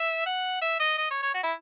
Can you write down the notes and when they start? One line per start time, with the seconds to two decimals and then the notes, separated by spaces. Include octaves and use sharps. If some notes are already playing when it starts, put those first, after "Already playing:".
Already playing: E5
0.26 F#5
0.61 E5
0.80 D#5
0.98 D#5
1.10 C#5
1.22 C#5
1.34 F#4
1.43 E4